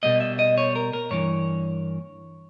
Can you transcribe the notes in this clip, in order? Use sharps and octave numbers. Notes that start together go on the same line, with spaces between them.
B2 G3 A#3 D#5
E5
D#5
C#5
A#4
A#4
G2 E3 A#3 C#5